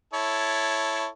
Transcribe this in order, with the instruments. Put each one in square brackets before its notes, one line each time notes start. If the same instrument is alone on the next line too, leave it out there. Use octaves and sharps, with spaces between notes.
[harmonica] E4 A4 C#5